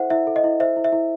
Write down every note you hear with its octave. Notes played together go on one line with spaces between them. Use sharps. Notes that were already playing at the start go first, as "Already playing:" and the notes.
Already playing: E4 A4 C5 E5 F#5
E4 E5
A4
D#5
E4
C5 E5
E4
E5
E4